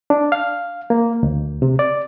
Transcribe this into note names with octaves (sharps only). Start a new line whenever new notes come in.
D4
F5
A#3
D2
C3
D5